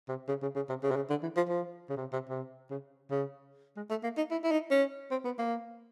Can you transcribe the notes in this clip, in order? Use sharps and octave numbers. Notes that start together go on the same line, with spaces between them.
C3
C#3
C#3
C#3
C3
C#3
C3
C#3
D3
E3
F3
F3
C#3
C3
C3
C3
C#3
C#3
G#3
A3
A#3
D#4
E4
E4
D#4
C#4
C4
B3
A#3